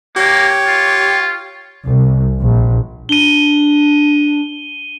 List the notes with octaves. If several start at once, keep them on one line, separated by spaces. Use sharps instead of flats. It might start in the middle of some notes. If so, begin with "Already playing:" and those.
A#3 G4 C#5
F4
C2
A#1
D4 D#7 G7